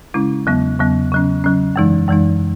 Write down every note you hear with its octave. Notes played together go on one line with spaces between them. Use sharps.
C#3 G#3 C#4 E4
E2 C#3 F#3 B3
E2 C#3 F#3 B3
C#3 F#3 C#4
C#3 F#3 C#4
F#2 E3 G#3 D#4
F#2 E3 G#3 D#4